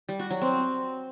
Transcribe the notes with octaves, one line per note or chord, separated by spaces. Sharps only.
G3
F#4
F#3
C4